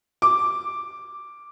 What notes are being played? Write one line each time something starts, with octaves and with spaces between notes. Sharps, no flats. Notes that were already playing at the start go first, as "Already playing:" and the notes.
D6